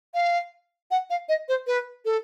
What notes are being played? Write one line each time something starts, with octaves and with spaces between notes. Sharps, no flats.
F5
F#5
F5
D#5
C5
B4
A4